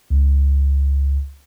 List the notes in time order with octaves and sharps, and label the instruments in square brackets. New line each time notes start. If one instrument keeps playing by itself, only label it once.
[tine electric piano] C#2